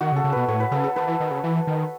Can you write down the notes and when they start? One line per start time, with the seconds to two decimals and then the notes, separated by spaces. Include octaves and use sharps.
0.01 D#3 F#4
0.12 C#3
0.16 A4
0.24 C#3
0.32 B2 B4
0.48 A2 C#5
0.60 B4
0.71 C#3 A4
0.84 A4
0.96 D#3 B4
1.07 E3
1.20 D#3
1.31 C#3
1.44 E3
1.67 D#3